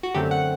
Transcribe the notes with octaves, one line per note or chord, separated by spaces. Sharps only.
F#4
F#2 D3 A3 C4 G4
F#5